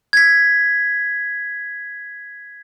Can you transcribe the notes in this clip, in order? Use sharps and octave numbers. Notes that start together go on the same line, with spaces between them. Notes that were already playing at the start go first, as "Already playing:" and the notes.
G#6 B6